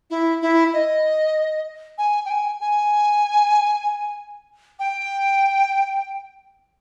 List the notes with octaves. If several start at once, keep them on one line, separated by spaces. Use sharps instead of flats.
E4
E4
D#5
G#5
G5
G#5
G#5
G5